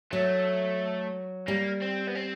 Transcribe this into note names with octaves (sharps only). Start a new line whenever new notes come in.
F#3 A3
G3 A#3
C4
B3
C4